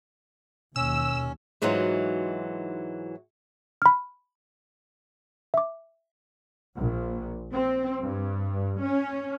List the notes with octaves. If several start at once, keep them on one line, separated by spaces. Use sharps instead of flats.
D#2 B2 C#4 E6
G#2 E3 F#3 D#4 F4 F#4
B5 F6
E5 D6
A#1
C4
G2
C#4